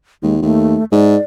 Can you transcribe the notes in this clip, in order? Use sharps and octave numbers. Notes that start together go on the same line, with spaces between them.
D#2 G#3
D#2 A3
G#2 D5